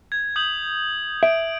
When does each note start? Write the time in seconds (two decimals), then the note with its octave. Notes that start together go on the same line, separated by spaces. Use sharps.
0.12 G#6
0.36 D#6 G6 F#7
1.23 E5 D7